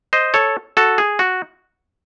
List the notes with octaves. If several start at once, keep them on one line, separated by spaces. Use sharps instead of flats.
C5 D#5
A4 C#5
F#4 A4
G#4
F#4